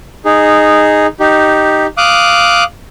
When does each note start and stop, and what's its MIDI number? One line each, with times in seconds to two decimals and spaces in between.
0.25 1.07 63
0.25 1.07 68
1.20 1.86 63
1.20 1.86 67
1.98 2.64 77
1.98 2.64 86
1.98 2.64 87
1.98 2.64 90